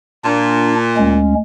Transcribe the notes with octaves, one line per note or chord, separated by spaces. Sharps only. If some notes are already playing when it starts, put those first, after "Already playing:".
A#2 D4
D2 G#3 C#4